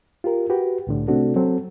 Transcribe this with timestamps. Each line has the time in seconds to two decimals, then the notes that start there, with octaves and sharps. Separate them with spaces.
0.24 F4 G4 A#4
0.50 F#4 G4 B4
0.87 C2 A2 D3
1.08 C3 A3 C4 D4 F#4 A4
1.36 F#3 C4 A4